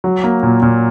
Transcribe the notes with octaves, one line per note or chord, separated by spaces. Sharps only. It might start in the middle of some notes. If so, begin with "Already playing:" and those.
F#3
A#3
A#2
A#2